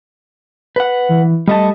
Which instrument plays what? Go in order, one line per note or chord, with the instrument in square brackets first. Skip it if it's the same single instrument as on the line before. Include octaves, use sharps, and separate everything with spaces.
[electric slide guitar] B4 F#5
[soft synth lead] E3
[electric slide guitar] G3 A3 A5 [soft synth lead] D#5